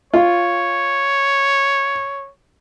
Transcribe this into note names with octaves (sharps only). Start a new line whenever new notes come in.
F4 C#5